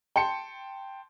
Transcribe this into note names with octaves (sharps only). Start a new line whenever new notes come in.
G5 A5 C6 C#7